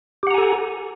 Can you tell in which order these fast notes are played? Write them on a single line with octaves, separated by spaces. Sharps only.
G4 F#5 A#5 G#5 A4